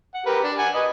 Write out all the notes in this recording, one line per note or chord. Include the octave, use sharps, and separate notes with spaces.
F#5
G4 A#4 B4
D4
F#5 G#5
B4 D#5